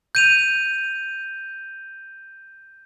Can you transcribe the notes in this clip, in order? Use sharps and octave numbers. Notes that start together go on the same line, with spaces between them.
G6 D#7 F7